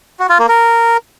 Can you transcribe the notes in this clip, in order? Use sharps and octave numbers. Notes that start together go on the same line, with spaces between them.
F#4
F4
A#3
A#4